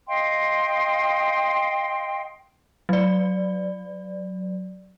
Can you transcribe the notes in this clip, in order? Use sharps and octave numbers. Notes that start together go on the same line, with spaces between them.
D#5 F5 G5 C6
F#3 D5